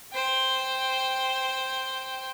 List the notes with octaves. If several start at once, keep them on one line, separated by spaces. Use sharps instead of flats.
C5 G5